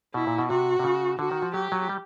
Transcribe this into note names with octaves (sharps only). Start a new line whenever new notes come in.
B2 E4
A#2
B2
C3 F#4
C3
C#3
D3 F#4
D#3
F3
F#3 G4
F#3
G3